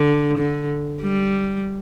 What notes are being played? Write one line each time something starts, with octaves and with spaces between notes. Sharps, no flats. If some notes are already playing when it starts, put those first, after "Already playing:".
Already playing: D3
D3
G3